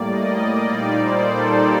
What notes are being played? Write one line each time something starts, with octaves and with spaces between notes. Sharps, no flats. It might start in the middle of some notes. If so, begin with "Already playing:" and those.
Already playing: A2 G3 A#3 D5
D#5
A#2 G3 A#3 D#4 D5
C5
A4